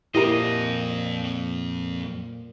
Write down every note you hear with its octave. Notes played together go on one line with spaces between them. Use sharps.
F2 A#2 E4 G4 A#4 C5 D#5